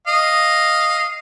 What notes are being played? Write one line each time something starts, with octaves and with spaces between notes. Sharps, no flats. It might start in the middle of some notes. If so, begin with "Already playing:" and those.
D#5 F5